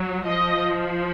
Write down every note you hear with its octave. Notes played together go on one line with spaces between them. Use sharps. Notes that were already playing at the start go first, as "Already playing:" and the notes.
Already playing: F#3
F3 D#5